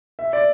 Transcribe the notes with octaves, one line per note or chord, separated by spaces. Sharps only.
E5
D5